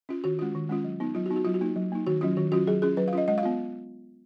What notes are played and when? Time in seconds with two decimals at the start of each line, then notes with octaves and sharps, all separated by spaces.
0.09 C#4 F4
0.24 D#3 F#4
0.39 G#3 C#4 F4
0.55 D#3
0.69 G#3 C#4 F4
0.84 F#3
1.00 B3 D#4
1.15 F#3 F4
1.26 F#4
1.30 B3 D#4
1.36 F#4
1.45 F#3 F4
1.54 F#4
1.61 A#3 D#4
1.76 F#3
1.92 A#3 D#4
2.07 D#3 F#4
2.21 F#3 C#4 F4
2.37 D#3 F#4
2.52 F#3 C#4 F4 F#4
2.67 F#3 G#4
2.82 C#4 F4 G#4
2.97 F#3 B4
3.08 F5
3.13 C#4 F4 D#5
3.28 G#3 D#5
3.38 F5
3.43 B3 F4